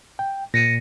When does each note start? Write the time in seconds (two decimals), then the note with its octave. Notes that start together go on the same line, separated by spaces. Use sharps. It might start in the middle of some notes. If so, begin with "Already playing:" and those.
0.19 G5
0.54 A#2 A#6 C#7 D#7